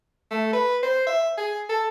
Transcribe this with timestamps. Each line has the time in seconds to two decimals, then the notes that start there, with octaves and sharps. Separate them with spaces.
0.31 A3
0.53 B4
0.83 C5
1.07 E5
1.38 G#4
1.70 A4